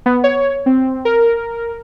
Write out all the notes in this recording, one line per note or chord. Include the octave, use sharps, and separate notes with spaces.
B3
C#5
C4
A#4